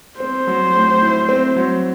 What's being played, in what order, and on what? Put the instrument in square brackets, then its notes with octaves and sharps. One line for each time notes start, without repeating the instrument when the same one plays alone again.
[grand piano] C4 [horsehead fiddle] C5
[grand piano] F#3
A2
E4
C4
F#3